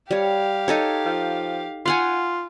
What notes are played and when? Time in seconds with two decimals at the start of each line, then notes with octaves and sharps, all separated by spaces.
0.11 G3 G4 C#5 F5
0.68 D#4 A4 C#5
1.05 F3
1.86 F4 F5 F#5 G#5